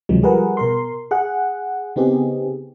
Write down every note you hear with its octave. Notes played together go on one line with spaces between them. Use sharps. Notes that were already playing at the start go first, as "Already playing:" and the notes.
D2 C3 D#3 F3 F#3 G#3
F3 G3 G#4 A#4 B4 F#5
B2 A#4 C6
G#4 F#5
C#3 B3 C4 D#4 G4 G#4